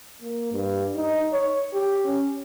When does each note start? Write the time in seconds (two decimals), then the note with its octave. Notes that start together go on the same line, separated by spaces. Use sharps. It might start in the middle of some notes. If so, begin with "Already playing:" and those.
0.22 A#3
0.53 G2
0.96 D#4
1.33 C#5
1.73 G4
2.05 C#4